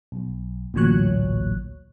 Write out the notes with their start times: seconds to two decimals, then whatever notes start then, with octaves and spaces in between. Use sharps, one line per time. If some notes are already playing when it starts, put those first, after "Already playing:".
0.12 B1
0.74 A1 D2 A#2 F#3 C#5 F#6